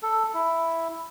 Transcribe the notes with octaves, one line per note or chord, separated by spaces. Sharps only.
A4
E4